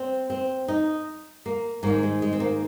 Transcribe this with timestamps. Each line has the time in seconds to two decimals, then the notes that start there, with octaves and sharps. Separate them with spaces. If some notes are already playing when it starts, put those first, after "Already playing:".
Already playing: C4
0.30 C4
0.68 D#4
1.46 A#3
1.83 G#2 D#3 A#3
2.03 G#3
2.22 G#3
2.33 C4
2.40 A#3